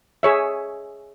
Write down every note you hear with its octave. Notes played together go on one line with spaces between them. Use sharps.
G#4 C#5 E5